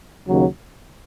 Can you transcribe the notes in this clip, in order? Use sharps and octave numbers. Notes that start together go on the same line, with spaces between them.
D#2 C#3 F#3